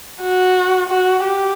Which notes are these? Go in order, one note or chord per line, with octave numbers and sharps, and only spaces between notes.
F#4
F#4
G4